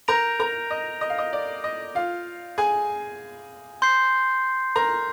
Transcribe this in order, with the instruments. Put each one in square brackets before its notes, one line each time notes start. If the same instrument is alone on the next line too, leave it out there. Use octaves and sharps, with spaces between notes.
[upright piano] A#4 A#5 [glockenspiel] G6 A#6 D7 F7
[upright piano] A#4 A#5
D#5
D#5
F5
D#5
D5
D#5
F4 F5
G#4 G#5
[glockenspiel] C6 G6 C7
[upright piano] A#4 A#5